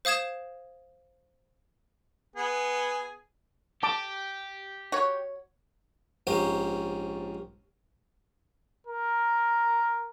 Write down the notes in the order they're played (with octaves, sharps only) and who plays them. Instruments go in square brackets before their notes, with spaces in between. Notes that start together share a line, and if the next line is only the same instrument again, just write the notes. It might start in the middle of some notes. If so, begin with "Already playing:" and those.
[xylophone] C5 F5 D#6 G#6 E7
[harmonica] B3 G#4
[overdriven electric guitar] G4 [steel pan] A5 D6
[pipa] F#4 C#5
[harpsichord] A#1 G#2 C#4 G4 A#4 F5
[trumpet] A#4